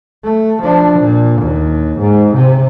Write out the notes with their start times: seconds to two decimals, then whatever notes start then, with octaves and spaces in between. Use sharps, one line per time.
0.24 A3
0.63 F3 D4
1.00 A#2
1.43 D#2
2.00 G#2
2.36 C3